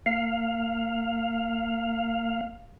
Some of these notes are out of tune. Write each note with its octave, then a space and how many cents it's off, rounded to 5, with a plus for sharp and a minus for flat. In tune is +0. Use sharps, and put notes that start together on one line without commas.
A#3 -35 F5 +0